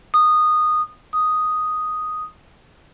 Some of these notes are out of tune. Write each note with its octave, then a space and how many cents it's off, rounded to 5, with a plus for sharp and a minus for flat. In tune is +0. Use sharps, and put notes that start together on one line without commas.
D#6 -15
D#6 +0